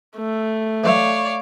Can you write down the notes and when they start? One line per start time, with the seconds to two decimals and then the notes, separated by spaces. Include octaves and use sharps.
0.17 A3
0.84 E3 F#3 C#5 D5 E5 F5